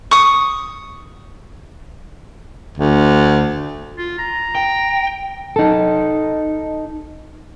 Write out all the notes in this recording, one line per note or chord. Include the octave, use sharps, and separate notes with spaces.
C#6 D#6
D2
F4
A#5
G5
D#4 A4